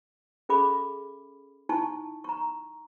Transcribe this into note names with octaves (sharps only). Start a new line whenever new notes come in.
C#4 G#4 A4 E5 B5 D6
D#4 E4 G#5 A5 C#6
A#5 C#6